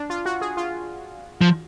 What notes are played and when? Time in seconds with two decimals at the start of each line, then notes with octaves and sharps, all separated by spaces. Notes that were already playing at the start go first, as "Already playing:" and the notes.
Already playing: D4
0.10 F4
0.26 F#4
0.41 G#4
0.57 F4
1.41 F3